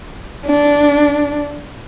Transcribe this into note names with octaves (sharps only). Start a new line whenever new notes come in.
D4